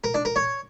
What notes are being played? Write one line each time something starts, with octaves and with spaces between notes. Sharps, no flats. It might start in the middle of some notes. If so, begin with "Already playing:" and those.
A#4
D4
A#4
C#5